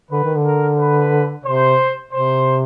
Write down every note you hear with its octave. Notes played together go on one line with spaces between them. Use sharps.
D3 B4
D#3
D3
A#4
B4
C3 C5
C3 C5